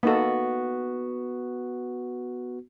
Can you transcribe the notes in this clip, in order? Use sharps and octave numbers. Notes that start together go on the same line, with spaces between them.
A#3 B3 D#4 F#4 A4